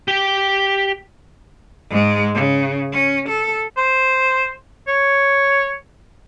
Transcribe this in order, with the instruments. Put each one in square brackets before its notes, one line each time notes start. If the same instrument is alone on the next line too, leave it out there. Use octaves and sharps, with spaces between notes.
[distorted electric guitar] G4 G5
[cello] G#2 G#3
C#3
C#4
A4
[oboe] C5
C#5